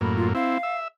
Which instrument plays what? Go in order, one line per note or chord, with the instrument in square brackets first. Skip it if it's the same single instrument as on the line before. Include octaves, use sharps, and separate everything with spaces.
[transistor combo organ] F#2 A2 A#3 [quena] B5
[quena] F4
[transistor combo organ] C4 E4 [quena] F5
[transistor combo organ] E5